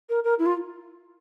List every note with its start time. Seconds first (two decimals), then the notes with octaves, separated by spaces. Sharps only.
0.09 A#4
0.24 A#4
0.39 E4
0.46 F4